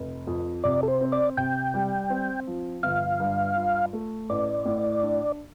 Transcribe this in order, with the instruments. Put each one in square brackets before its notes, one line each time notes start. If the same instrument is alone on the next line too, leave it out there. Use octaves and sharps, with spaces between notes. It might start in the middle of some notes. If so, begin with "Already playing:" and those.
Already playing: [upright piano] F1
F2
[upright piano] C3 [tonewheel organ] D5
[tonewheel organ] A4
C5
[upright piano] C4
[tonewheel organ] D5
[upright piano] C3 [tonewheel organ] G5
[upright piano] G3
C4
F3
[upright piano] G1 [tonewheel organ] F5
[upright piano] G2
F4
A3
[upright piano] A1 [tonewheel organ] D5
[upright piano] A2
D4